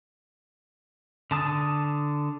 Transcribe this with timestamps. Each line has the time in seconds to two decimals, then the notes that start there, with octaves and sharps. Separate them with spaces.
1.31 D3 A5 D#6